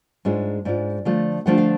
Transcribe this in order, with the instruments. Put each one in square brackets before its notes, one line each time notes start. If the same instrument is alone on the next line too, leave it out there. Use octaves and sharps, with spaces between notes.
[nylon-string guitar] G#2 G#3 D4 F4 C#5
G#2 G#3 D4 F4 D5
D3 F3 A3 D4 F4
D3 F3 A3 D4 F4 F#5
F5